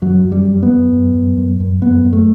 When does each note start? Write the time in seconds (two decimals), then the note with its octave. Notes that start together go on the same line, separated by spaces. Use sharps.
0.02 F#2 F#3
0.24 F#2
0.32 G3
0.48 F#2
0.63 B3
0.70 F#2
0.92 F#2
1.15 F#2
1.37 F#2
1.60 F#2
1.82 F#2 B3
2.05 F#2
2.13 A3